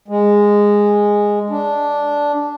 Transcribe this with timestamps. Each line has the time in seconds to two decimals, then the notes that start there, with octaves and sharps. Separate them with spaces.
0.08 G#3
1.50 D4